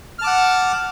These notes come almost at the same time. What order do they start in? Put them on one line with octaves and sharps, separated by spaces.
F6 A5 D6 F#5